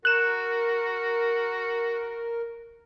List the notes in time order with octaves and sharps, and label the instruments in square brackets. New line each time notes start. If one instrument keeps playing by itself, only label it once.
[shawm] F#4 [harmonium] A#4 [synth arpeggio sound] F#6 E7